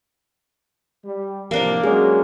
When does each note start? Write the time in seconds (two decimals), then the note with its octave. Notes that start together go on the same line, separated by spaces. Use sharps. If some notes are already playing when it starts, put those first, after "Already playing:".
1.05 G3
1.51 A2 C3 F3 A#3 D4
1.84 F#3 G#3 C#4 G#4